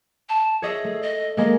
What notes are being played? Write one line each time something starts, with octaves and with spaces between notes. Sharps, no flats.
A5
G#4 C#5 D#5 E5
A3
D#5
G#3 A#3 D#5